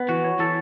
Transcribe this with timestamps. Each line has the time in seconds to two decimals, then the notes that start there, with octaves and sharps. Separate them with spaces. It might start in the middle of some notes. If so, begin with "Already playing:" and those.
Already playing: B3
0.08 E3 F#4
0.24 C#5
0.39 E3 A4